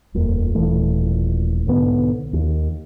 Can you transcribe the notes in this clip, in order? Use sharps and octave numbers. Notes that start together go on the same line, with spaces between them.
D#1 F2 A#3
D#1 A#2 E3 A3
B1 G#2 D3 B3
D#2